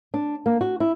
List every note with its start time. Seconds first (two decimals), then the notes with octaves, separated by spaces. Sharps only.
0.14 D4
0.46 A#3
0.61 F#4
0.80 E4